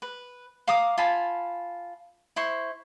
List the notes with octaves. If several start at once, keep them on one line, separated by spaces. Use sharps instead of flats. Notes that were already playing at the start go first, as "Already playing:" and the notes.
B4
F5 A#5 D6 D#6
F4 G#5 A5 B5
E4 C5 C6 C#6